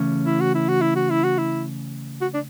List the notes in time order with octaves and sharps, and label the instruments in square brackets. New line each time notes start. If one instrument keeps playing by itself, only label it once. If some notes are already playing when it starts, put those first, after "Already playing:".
Already playing: [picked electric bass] C#3 E3 A3 C#4
[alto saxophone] E4
F#4
E4
F#4
E4
F#4
E4
F#4
E4
F#4
D4